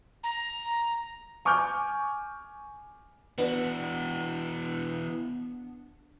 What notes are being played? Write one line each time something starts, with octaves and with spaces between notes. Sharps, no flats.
A#5
G#5 C#6 D6 F6 G6
E3 B3 D4 F#4